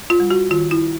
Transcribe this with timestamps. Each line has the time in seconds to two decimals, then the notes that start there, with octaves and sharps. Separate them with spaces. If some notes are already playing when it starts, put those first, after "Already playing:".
0.10 F4
0.20 G3
0.30 F#4
0.51 D#3 F4
0.71 E4